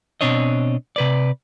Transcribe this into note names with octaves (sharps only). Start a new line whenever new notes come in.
B2 C4 D4 C#5 D#5
C3 B4 D5